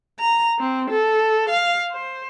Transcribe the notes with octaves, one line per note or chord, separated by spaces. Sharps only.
A#5
C4
A4
F5
C5